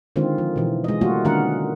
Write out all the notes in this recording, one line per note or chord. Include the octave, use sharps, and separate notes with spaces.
D3 D#3 G#3 C4 F4
F3
B2 E3
G#3 D#5
F#3 G3 A3 A#3 F4 F#4
D3 D#3 G#3 C#4 A#4 F#5